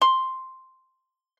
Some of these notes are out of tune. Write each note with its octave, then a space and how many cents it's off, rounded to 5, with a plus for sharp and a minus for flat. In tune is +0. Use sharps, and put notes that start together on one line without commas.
C6 +0